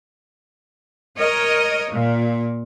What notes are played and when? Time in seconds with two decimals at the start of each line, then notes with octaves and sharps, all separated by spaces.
1.17 A#4 C#5 D#5
1.93 A#2